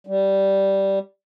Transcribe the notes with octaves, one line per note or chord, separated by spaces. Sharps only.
G3